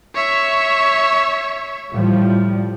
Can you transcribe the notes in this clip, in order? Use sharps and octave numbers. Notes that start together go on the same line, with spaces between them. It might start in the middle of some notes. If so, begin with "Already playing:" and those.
C#5 E5
A2 F3 G3